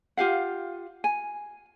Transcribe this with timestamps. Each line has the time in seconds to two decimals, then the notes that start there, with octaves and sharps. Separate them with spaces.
0.17 F4 G4 F5 F#5
1.04 G#5